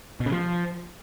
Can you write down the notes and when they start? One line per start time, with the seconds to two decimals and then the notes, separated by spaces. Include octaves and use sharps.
0.20 B2
0.26 C#3
0.32 F3